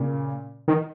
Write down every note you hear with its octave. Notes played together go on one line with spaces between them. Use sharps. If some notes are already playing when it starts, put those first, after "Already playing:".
Already playing: A#2 C#3
D#3